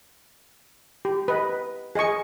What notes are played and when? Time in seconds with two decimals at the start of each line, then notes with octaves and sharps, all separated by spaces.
1.05 G4
1.28 B4 D#5
1.95 G#4 D#5 G#5 C#6